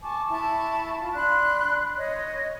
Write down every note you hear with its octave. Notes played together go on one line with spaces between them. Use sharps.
G#5 A5 C#6 D6
E4 A5 B5 C#6
F4
D4 B5 C6 F#6
C#5 D#5